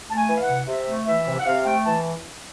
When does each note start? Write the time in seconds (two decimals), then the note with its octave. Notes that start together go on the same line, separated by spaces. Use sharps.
0.09 A3 A5
0.16 G#5
0.29 E3
0.37 F5
0.42 F#5
0.48 C3
0.68 C3 E5
0.87 A3
1.07 E3 E5
1.27 C3
1.39 F#5
1.46 C3 F5
1.66 A3 G5
1.85 E3 A5